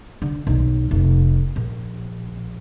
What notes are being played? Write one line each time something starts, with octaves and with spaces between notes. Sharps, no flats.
D3
B1 D#3
F1
A#1